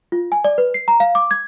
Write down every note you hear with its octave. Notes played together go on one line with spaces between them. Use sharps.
F4
G#5
D5
B4
C7
A#5
F5
D6
G#6